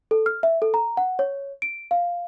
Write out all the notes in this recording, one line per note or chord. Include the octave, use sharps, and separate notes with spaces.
A4
F6
E5
A4
A#5
F#5
C#5
D7
F5